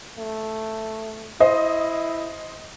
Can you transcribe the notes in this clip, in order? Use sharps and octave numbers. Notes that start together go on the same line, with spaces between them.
A3
E4 C5 D#5